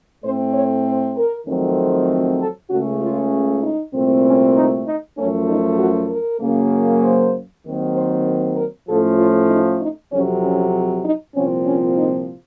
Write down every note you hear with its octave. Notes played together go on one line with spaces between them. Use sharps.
A2 A3 C4 C5
C#5
C5
A#4
F2 D#3 F#3 A3 C4
F#4
A4
C#2 C#3 A3 C#4 F#4
F4
D#4
C2 A#2 A3 C4
C#4
D#4
D#4
F#2 F3 A3 C#4
D#4
F#4
A#4
F#2 C#3 F#3 A#3
C5
D#2 D#3 F#3 C4
C5
A#4
A2 F3 A3 C#4 A4
F4
D#4
D#4
F2 C3 F#3 C#4
C#4
D#4
C2 A#2 F3 C4 C#4
C#4
D#4